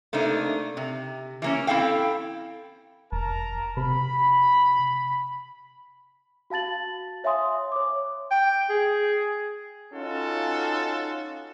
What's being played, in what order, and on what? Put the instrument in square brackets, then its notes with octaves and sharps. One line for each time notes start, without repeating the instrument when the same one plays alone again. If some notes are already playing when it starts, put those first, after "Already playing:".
[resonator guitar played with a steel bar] C3 A3 A#3 D4 D#4
C3
E3 A#3 C#4
C4 E4 A4 F5 G5
[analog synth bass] F1 [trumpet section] A#4 A5 A#5
[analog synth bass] C3 [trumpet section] B5
[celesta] F#4 F5 A5 A6 F#7
C#5 E5 F5 G#5 C6 D#6
C#5 D6
[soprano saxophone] G5
G#4
[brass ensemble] C#4 D#4 F4 F#4 A4